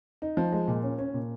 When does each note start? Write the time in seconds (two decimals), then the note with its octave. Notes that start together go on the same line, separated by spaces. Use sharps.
0.22 D#4
0.37 F3
0.52 G#3
0.68 A#2
0.83 C#4
0.98 C#4
1.14 A#2